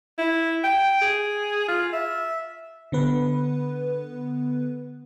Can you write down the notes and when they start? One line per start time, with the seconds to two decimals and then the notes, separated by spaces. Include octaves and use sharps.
0.19 E4
0.64 G5
1.02 G#4
1.68 F4
1.93 E5
2.92 D3 B3 B4